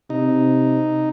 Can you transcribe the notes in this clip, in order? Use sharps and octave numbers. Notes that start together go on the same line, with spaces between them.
C3 D#4